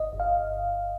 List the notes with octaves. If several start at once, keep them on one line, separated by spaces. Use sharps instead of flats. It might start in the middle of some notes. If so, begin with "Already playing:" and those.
Already playing: G1 D#5
G1
F5